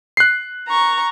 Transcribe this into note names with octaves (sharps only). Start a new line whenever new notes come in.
F#6 C7
A#5 C#6